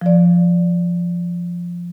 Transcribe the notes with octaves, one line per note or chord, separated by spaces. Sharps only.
F3 D5